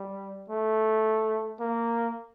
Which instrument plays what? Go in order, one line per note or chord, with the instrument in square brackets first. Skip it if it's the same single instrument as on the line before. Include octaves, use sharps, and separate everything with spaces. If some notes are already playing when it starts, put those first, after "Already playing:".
Already playing: [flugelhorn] G3
A3
A#3